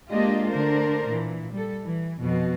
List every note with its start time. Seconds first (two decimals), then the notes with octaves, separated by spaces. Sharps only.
0.10 G#3 A#3 D4 F4 G4 D#5
0.50 D3 A3 D4 A#4 C5
1.08 A#2 E3
1.52 G3 A4
1.84 E3
2.20 F2 B2 F#3